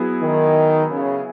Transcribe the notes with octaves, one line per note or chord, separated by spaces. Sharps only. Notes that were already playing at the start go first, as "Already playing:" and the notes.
Already playing: F#3 B3 E4 G#4
D#3
C#3